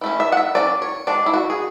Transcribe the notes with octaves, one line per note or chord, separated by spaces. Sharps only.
E3 A3 C#4
E5
F#5
E5
F#3 C#4 D5
C#5
G#3 D4 D5
E4
F#4
G#4